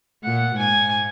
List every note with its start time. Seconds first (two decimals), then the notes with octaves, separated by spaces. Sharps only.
0.24 A#2 F#5
0.56 G#2 G#5